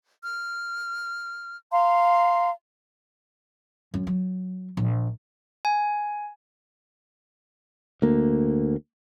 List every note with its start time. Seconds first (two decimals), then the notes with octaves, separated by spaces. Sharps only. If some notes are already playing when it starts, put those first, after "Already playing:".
0.24 F6
1.72 F5 A#5 C6
3.94 F#2
4.07 F#3
4.77 A#1
5.65 G#5
8.02 D2 A#3